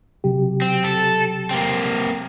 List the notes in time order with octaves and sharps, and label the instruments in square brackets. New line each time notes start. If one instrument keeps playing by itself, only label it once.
[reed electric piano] C3 F#3 G4
[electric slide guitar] C4
A4
A#3 C4